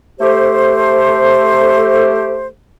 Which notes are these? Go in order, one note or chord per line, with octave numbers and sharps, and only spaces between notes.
A3 G4 C5